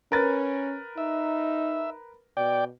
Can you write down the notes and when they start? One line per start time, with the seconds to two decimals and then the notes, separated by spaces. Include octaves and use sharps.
0.12 C#4 A#4 B4 A6
0.98 D#4 E5
2.37 B2 D5 G5